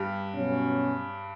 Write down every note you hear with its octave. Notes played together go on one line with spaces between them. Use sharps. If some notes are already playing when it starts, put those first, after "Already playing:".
Already playing: G2 G3
B2 F#3 C#4